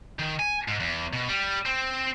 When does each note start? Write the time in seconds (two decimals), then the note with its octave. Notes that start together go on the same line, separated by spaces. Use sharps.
0.19 D#3
0.39 G#5
0.68 G#2
0.80 E2
1.13 B2
1.28 G3
1.66 C4